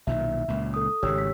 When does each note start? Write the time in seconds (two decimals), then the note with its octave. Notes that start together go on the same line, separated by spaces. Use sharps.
0.07 B1 A#2 D#3 E5
0.48 C#2 A#2
0.74 A4 D#6
1.03 G#1 G#2 C#3 G4 C#5 E6
1.18 B6